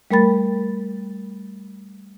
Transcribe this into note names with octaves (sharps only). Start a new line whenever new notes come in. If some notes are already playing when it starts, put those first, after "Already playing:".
G3 A3 A#4 G5 B5 A6